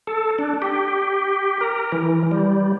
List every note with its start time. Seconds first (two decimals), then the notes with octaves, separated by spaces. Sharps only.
0.07 A4
0.39 D4
0.62 G4
1.61 A#4
1.92 E3
2.31 G3